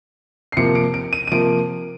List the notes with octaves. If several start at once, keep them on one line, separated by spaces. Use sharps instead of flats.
C7
C3 F3 A#3 C#7
D7
D7
D#7
D#7
C3 F3 A#3 D7